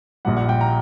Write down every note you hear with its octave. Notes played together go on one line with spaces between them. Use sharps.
A#1 A#2 G3 F#5
F#5
G5
A#5